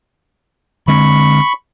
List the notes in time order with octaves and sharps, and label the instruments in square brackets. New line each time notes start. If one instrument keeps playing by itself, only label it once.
[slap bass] D3 G#3 C4 [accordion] B5 C#6